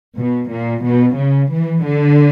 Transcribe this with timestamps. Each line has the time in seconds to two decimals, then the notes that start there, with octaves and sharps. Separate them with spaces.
0.17 B2
0.51 A#2
0.85 B2
1.18 C#3
1.52 E3
1.86 D3